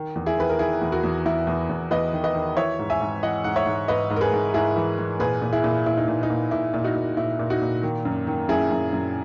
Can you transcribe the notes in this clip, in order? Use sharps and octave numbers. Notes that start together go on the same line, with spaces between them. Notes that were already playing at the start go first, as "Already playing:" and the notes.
Already playing: D#3
E2
E4 G#4
D#3 B4
A#4
D#3 E4 G#4
E2
F#4 A#4
E2
E2 E4
E2
E2
E2 B4 D#5
D#3
B4 D#5
D#3
E3 C#5 E5
G#2
E5 G#5
G#2
E3 D#5 F#5
G#2 F#5
C#5 E5
G#2
G#2 B4 D#5
G#2
A#4
G#4 B4
G#2
G#2 E4 G#4
E3
E3
A#2 G#4 B4
A#2
E4 G#4
A#2
A#2 E4
D#4
A#2
D#4
A#2
A#2 E4
A#2
D#4 F#4
A#2
A#2 E4
A#2
D#4 F#4
A#2
D#3
F#2
D#3
F#2 E4 G#4
F#2
F#2